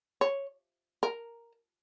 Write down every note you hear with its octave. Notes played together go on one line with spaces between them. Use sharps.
C#5
A#4